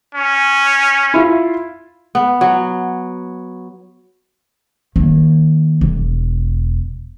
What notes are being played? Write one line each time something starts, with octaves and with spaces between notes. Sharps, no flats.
C#4
E4 F4
B3
F#3
D#3 A#3
E1